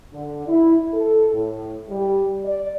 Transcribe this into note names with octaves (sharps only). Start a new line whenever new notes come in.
D3
E4
A4
A2
G3
D5